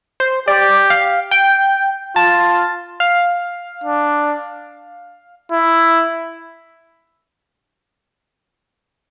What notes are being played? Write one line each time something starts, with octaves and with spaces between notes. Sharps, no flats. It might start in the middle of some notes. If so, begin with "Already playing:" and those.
C5
G4 D5
F5
G5
F4 A5
F5
D4
E4